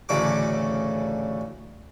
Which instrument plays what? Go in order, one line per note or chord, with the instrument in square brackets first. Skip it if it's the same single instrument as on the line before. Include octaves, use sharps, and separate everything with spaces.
[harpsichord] A1 D2 C#3 A3 F#4 D6